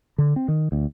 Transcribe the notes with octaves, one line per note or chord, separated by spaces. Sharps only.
D3
C4
D#3
D2